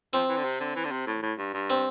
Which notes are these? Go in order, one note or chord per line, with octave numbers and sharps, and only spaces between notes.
F3 C4
E3
D3
C3
D3
E3
D3
C3
A2
A2
G2
G2
C4